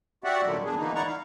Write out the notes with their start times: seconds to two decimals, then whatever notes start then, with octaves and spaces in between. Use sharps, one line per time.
0.24 F#4 G4 D5 E5 F#5
0.45 A#2 D3 D#3 F#3 G3 A3
0.65 A#3 B3 D4 G#4
0.77 D3 E3 F3 A#3 B3 D#4
0.95 D#4 E4 D5 F#5 A#5 C#6
1.07 F5